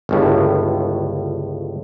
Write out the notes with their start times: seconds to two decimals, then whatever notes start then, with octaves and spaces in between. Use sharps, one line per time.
0.09 G1 C#2 A2